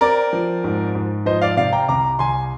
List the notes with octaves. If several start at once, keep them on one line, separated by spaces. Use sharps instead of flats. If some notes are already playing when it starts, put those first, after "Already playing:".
C4 A#4 D5
F3
G#2
G#2
F3 C5 D#5
D5 F5
C3 D5 F5
G5 A#5
C2 A#5 D6
C2 G#5 C6